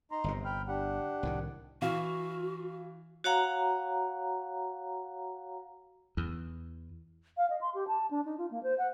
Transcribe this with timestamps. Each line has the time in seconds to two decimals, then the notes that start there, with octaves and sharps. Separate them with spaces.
0.12 D#4 A#5 C6
0.24 G1 C3
0.45 G5 B5 F6
0.68 D4 G4 F#5
1.23 C2 A2 D#3
1.82 E3 F#4 F5
3.24 F#4 C#5 F5 F#5 A#5
6.17 E2
7.37 F5
7.50 D#5
7.61 C6
7.75 G4
7.88 A5
8.11 D4
8.25 D#4
8.38 F4
8.51 A#3
8.63 C5
8.78 F#5